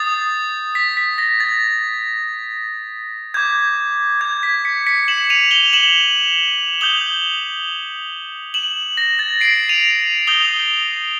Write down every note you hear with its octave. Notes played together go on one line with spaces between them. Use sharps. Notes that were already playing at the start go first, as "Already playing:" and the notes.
Already playing: D#6 G6 A6
B6
B6
A#6
A6
D6 G6 G#6
G#6
B6
B6 C#7
B6 C#7
E7 F#7
D#7 F7
F7 G7
E7 F#7
D#6 G6 F7 G7
E7 F#7
A#6
A6
C7 D7
D#7 F7
D#6 G6 F7 G7